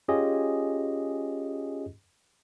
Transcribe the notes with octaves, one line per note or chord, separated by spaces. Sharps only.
C#4 F4 G4 G#4 D#5